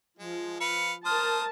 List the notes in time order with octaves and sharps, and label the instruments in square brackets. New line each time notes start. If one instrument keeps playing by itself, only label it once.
[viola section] F3 [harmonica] G#3
[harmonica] B4 F5 [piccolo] C#7
[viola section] A#4 A5 [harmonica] C5 D#6 [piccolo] F6